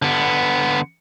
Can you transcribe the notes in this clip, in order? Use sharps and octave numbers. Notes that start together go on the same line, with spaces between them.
D3 B3